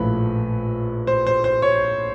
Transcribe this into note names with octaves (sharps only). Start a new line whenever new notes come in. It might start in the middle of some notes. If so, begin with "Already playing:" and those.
Already playing: A#1 A2 F3 B4
C5
C5
C5
C#5